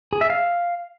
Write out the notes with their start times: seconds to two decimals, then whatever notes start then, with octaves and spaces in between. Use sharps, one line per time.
0.13 G#4
0.21 E5
0.30 F5